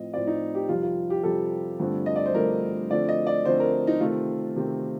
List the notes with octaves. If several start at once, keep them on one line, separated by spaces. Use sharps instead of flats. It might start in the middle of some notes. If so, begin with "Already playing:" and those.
Already playing: A2 F3 C4 D#5
A2 F3 C4 D5
D#4
G4
F2 C3 G3 F4
F4
G4
F2 C3 G3 A4
G2 D3 F3 A3 C4
D#5
D5
C5
G2 D3 F3 A3 C4 A#4
D3 F3 A3 C4 D5
D#5
D5
D3 F3 A3 C4 C5
A#4
D#4
C3 D#3 A3 C4 F4
C3 D#3 A3 C4